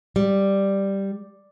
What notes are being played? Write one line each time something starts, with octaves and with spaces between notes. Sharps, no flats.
G3